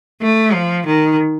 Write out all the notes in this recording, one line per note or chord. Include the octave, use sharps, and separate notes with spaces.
A3
F3
D#3